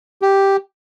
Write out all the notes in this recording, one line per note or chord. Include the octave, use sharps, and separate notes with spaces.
G4